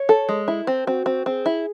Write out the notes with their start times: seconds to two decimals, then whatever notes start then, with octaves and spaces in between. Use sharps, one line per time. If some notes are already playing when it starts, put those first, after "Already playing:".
Already playing: C#5
0.09 A4
0.29 G#3
0.48 E4 A4
0.67 C4
0.86 C4 F#4
1.06 C4
1.26 C4 G#4
1.46 E4